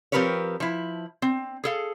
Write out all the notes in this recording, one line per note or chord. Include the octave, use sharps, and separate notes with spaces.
F3 C4 G4 A#4 B4 C#5
F3 E4
C4
G#4 A4 F5